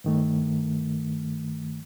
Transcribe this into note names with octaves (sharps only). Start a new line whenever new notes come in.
G2 D#3 A3